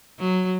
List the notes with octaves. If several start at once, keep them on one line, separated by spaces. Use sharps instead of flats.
F#3